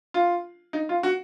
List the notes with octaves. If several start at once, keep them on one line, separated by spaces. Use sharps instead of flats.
F4
D#4
F4
F#4